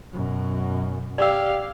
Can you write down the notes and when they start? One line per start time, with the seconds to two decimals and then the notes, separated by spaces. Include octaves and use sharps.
0.12 F#2 B2
1.18 G4 D5 F5 E6